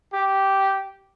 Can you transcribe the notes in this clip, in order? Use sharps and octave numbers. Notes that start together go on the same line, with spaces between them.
G4